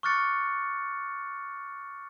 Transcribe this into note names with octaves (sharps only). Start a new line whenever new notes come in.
C#6 D6 F6 F#6 A6 C#7